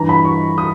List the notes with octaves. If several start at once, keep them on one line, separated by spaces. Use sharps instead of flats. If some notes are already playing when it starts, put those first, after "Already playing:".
Already playing: G2 E3 A#5
B5
C#6
D#6